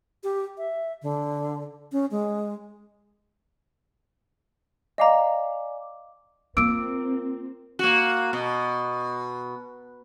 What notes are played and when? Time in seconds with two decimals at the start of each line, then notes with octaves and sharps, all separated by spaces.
0.24 G4
0.58 E5
1.02 D3
1.92 C#4
2.11 G#3
4.98 D5 D#5 F5 G#5 A#5 D6
6.57 A#3 C4 F4 A#4 D6 E6 D7
7.79 A#3 F#4
8.33 B2